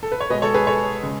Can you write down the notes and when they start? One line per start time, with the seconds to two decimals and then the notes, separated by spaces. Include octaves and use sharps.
0.03 A4
0.12 B4
0.20 C#5
0.30 B2 G#3 B4 D#5
0.42 A4 C#5
0.54 G#4 B4
0.67 A4 C#5
1.03 C#3 G#3